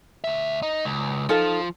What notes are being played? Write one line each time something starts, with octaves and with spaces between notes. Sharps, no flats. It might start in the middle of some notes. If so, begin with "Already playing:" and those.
D2 E5
D#4
C#2
F3 D#4 F4 A4